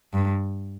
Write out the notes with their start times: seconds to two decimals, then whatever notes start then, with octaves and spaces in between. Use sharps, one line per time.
0.13 G2